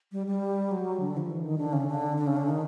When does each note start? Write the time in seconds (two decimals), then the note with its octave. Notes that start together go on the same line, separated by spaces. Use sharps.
0.12 G3
0.27 G3
0.71 F#3
1.00 D3
1.17 F3
1.30 E3
1.44 D#3
1.58 D3
1.73 C#3
1.87 D3
2.17 D3
2.27 C#3
2.37 D3
2.46 D#3